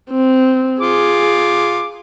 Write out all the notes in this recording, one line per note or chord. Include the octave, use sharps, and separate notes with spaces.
C4
F4 G#4 D6